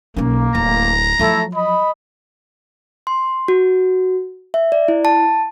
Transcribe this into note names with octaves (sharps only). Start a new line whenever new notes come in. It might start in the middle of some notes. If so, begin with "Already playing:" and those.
B1 A#3 C#4
D1 A#5
F3 F#3 A3 E4 A4
D#5 B5
C6
F#4
E5
D5
E4
A5